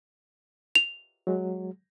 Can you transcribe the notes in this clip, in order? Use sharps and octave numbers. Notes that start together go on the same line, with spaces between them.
F7
F#3 G#3